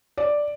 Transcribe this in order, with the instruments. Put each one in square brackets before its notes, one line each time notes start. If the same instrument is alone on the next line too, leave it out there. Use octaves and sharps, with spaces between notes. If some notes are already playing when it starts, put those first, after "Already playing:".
[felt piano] D5